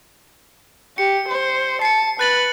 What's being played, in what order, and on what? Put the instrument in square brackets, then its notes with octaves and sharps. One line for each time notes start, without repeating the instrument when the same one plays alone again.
[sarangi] G4 [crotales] C#7
[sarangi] C5
[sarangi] A5 [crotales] C7 C#7
[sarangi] B4 [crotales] F#6 A6 F#7